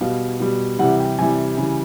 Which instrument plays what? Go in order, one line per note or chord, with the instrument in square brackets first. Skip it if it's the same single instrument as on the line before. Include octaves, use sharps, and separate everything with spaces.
[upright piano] B2 G3 F5
B2 G3
C3 E3 G3 F#5
G5
C3 E3 G3 G#5
C#3 E3 G3